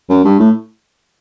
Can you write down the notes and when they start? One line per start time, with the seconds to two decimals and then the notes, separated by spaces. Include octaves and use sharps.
0.09 F#2
0.24 G2
0.39 A2